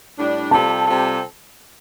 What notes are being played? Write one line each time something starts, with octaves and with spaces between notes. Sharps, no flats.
A2 G3 D4
C3 G3 C4 F4 A4 A5
C3 G3 C4 F4 A4